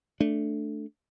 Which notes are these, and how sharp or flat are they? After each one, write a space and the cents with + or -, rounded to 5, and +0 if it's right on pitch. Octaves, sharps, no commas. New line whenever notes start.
A3 +0 D4 +0